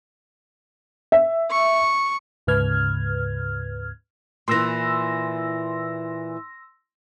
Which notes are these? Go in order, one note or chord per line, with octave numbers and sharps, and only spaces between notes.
E5
C#6
D2 G#2 C#3 B4 F6 G#6
A#2 E3 C6 E6 A#6